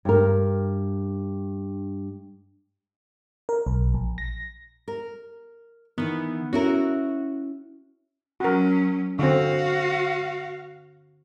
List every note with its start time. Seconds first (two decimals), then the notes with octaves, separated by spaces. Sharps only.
0.05 G2 A#4
3.49 A#4
3.67 B1
3.94 A#1
4.18 A#6
4.88 A#4
5.98 D#3 E3 B3
6.53 C#4 E4 F#4 A#4
8.40 F#3 C#4 F#4 A#4
9.19 D3 C4 F#4 F5